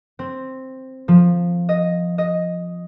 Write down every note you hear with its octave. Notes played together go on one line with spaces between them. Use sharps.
C4
F3
D#5
D#5